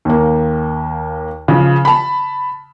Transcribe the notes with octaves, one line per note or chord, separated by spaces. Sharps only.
D#2 A#3
C#3 F3
A5 B5